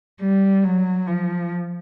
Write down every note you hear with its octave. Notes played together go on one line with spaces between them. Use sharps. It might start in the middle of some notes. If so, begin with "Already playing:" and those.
G3
F#3
F3